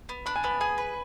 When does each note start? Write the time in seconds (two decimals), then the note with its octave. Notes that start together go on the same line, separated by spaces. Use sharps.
0.09 B3
0.26 D4 B5
0.36 G#5
0.44 B3 B5
0.61 G#4 G#5
0.78 B4